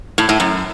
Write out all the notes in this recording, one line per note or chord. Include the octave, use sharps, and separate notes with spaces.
A2
A2
F#2